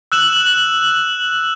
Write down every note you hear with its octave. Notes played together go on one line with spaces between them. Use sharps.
E6 F#6 E7 F#7